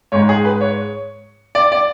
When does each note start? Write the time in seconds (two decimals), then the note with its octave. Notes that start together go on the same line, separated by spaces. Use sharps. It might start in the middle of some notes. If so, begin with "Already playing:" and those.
0.12 G#2 G#3 C#5
0.29 G#4
0.45 B4
0.61 C#5
1.55 D5
1.72 D5